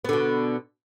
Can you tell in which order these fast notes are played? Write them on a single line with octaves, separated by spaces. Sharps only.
B3 D3 B2